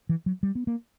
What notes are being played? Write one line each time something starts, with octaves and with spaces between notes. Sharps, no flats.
E3
F#3
G3
B3
A#3